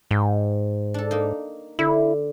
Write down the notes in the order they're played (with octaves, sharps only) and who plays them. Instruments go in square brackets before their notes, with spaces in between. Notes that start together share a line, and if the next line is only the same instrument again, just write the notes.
[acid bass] G#2 [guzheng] G5
[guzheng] D4 A4
A#3 D#4
[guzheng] D3 [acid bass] E4